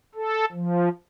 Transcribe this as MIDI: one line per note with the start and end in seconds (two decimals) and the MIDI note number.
0.15 0.45 69
0.52 0.89 53